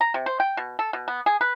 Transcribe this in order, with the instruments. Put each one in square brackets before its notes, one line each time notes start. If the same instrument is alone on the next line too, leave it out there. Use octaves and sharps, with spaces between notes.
[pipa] A#5
C3
C5
G5
B2
A4
B2
B3
G#4
B4